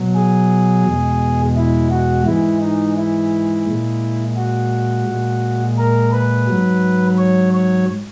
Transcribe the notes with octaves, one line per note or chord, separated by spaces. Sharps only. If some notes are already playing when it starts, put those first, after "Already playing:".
Already playing: B2 F#3
G#4
E2 B2 G#3
E4
F#4
G#2 E3 G#3 E4
D#4
E4
A#2 G#3
F#4
A#2 G#3
A#4
B4
G#2 F#3
C#5
C#5